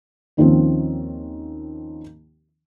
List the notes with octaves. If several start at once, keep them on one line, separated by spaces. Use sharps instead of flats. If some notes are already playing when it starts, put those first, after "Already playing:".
D#2 D#3 F3 C4 C#4